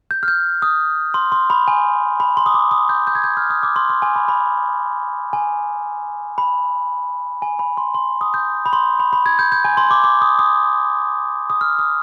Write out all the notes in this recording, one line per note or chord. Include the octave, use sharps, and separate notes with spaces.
G6
F6
G6
D#6
C6
C6
B5
G#5
B5
C6
D#6
D6
D#6
G6
G6
G#6
G6
F6
D#6
D6
C6
C6
G#5
B5
B5
G#5
B5
G#5
B5
C6
C6
D#6
G6
B5
C6
B5
B5
G#6
G6
G6
G#5
C6
D6
D6
D#6
D#6
D#6
F6
D#6